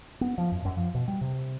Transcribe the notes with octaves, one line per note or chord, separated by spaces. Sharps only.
B3
F3
F#2
F#2
F3
B2
G3
C3